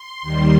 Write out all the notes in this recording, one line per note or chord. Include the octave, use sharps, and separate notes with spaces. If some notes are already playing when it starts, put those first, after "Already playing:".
Already playing: C6
D#2 D#3 G3